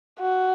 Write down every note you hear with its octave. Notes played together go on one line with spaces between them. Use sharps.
F#4